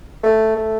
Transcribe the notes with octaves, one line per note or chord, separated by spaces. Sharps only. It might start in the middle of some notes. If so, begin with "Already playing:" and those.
A3
A3